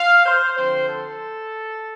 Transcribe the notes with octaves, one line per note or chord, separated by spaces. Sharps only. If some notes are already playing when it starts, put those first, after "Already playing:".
Already playing: F5
C5
D3 F3 C4 C5
A4